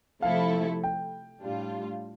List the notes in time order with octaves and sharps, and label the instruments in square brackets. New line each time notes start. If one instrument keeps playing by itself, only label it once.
[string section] C3 F3 A3 E4 A4 [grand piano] F5
[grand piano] G5
[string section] A2 G3 D4 F4